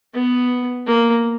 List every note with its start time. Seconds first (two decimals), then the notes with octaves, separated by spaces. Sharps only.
0.14 B3
0.86 A#3